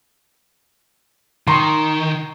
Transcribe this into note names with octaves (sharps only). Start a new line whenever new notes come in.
D#3 A#5 C6 C#6